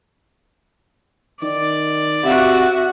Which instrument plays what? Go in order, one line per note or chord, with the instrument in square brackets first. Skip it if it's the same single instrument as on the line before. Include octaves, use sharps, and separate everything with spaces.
[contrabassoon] D#3 [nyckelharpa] D5
[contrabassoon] C3 [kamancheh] F#4 E5 [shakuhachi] F#5